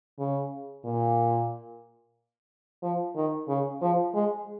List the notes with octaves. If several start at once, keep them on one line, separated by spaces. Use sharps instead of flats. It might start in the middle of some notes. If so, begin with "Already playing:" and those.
C#3
A#2
F3
D#3
C#3
F3
G#3